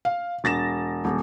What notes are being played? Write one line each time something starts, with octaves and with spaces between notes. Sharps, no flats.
F5
E1 A6 A#6 E7
D#1